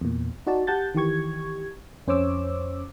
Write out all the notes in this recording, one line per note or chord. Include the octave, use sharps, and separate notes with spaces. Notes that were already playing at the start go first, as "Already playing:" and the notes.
E2 A#2
D#4 F#4 D5 A5
G4 F#5 A5 G6 A6
D#3 E3 G4 C#6 G#6
F2 C#4 C5 C#5 D6 E6